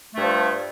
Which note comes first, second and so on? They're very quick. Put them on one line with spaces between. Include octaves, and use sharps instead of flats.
A3 G2 F3